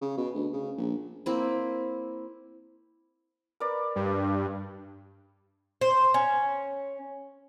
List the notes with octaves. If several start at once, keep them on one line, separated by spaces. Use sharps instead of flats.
C#3
B2
D2
C#3
A#1
A#3 C4 E4
A#4 B4 D5
G2
C5
C#4